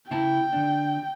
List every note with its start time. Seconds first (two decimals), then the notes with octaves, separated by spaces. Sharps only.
0.11 C#3 E4 G5 A5
0.53 D3 D4